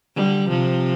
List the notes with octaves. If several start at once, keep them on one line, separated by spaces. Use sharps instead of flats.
D3 G3
C3 F3